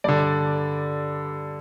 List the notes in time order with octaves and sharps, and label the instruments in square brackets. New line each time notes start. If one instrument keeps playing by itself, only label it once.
[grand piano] G2 D3 D5